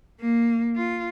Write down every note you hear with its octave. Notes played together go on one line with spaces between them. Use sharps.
A#3
F4